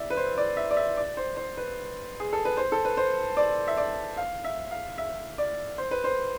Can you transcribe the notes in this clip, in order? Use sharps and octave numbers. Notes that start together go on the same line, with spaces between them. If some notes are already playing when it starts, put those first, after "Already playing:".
Already playing: D5 E5
B4
C5
D5
E5
D5
E5
D5
C5
C5
B4
G#4
A4
B4
C5
A4
B4
C5
D5
E5
D5
F5
E5
F5
E5
D5
C5
B4
C5